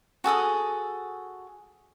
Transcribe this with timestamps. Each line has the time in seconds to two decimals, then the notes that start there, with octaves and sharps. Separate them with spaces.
0.24 F#4 G#4 A4 D#6